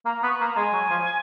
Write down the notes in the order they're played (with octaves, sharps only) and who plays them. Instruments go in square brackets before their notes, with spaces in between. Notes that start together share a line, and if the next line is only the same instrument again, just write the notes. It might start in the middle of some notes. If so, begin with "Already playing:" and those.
[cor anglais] A#3 [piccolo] A#5
[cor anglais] B3 [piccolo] C#6
[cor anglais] A#3 [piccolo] B5
[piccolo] A#5
[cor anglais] G#3 [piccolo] G#5
[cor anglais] F#3
F3